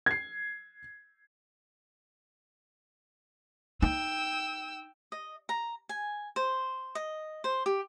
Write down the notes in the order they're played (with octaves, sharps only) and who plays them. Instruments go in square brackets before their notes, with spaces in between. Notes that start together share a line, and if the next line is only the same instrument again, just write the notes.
[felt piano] G#6 C7
[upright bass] D#4 [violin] G5 E6
[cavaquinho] D#5
A#5
G#5
C5
D#5
C5
G4